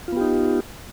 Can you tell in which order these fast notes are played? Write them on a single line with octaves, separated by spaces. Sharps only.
F4 B3 G4 D#4